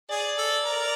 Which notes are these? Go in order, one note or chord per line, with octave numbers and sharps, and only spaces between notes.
G#4 D5
A4
A#4